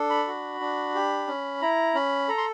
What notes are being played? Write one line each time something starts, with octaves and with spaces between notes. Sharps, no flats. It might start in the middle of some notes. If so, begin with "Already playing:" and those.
Already playing: D4 A4
B5
F#4
D4
G4
C#4
E4 A#5
C#4 B5
A4 A#5
C6